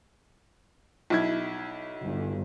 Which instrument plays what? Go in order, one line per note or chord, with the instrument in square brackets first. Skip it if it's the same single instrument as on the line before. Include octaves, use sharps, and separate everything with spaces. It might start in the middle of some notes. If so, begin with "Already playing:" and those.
[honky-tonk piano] B1 E4 G#6
[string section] G1